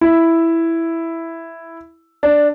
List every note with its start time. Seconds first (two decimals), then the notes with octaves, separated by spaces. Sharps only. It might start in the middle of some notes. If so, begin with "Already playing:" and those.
0.01 E4
2.23 D4